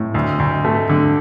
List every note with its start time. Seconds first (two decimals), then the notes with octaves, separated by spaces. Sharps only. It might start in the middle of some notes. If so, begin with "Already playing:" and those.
Already playing: A2
0.14 D2
0.39 D2
0.65 A3
0.89 D3